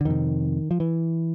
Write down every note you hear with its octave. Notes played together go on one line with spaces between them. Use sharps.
D3
F2 C3 D#3
F3
E3